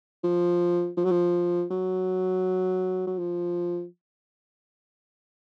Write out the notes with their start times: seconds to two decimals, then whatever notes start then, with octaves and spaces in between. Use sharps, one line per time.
0.24 F3
0.97 F3
1.05 F#3
1.11 F3
1.71 F#3
3.07 F#3
3.19 F3